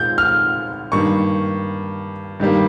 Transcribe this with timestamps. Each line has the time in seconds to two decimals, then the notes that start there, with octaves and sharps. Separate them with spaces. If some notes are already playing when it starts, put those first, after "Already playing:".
Already playing: A#2 G#3 G6
0.18 F6
0.92 G2 D#3 A#3 C#6
2.40 G2 D#3 G3 A#3